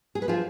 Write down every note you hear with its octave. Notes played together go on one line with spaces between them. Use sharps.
G#4
B4
F3 F4 G#4